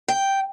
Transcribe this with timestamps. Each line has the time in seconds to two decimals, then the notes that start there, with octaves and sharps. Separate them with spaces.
0.08 G5